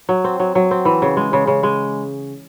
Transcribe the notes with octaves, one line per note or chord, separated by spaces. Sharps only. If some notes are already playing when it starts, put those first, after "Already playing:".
F#3
C4
F#3
F#3
C4
E3
C#3
G#3
C#3
C#3
G#3